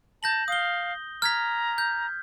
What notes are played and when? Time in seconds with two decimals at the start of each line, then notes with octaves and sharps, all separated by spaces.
0.23 A5 G6 A#6 F#7
0.48 F5 D#6 G7
1.22 A#5 F6 G#6 B6
1.78 G6